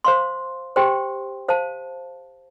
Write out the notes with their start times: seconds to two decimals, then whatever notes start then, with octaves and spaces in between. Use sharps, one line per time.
0.04 C5 F5 C6
0.76 G4 C5 G5 C6
1.48 C5 F5 A5